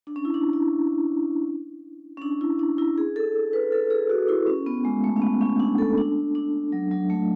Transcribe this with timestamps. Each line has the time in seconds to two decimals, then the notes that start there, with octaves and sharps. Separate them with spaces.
0.07 D4
0.16 C#4
0.25 E4
0.34 D4
0.53 E4
2.17 C#4
2.22 D4
2.41 E4
2.59 D4
2.78 E4
2.98 G#4
3.16 A4
3.53 B4
3.72 A4
3.90 G#4
4.10 F#4
4.28 E4
4.47 C#4
4.66 B3
4.85 G#3
5.04 A3
5.16 C#4
5.22 B3
5.41 C#4
5.60 D4
5.78 A4
5.98 D4
6.35 D4
6.72 F#3
6.91 F#3
7.10 A3